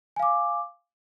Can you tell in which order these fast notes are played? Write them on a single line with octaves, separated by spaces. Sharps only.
G#5 F5 D6